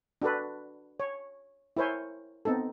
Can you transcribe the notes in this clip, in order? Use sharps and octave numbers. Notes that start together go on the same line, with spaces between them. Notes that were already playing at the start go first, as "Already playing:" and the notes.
D4 F#4 A4 B4
C#5
E4 A#4 C5 C#5 G#5
B3 C4 D#4 A4